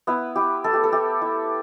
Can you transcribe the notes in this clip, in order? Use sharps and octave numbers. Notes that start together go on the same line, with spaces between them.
B3 E4 B4
E4 G4
A3 A4
G4
A4
A3 G4
E4